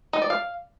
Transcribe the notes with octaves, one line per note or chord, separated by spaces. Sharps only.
D#4
D5
F5